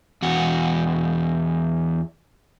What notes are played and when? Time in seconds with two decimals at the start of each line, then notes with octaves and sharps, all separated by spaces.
0.22 E2 F#4